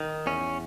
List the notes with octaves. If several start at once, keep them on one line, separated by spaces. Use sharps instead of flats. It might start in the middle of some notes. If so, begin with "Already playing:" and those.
Already playing: D#3
E2 C#4